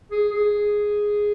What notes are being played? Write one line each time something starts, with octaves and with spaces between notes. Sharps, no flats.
G#4
G#4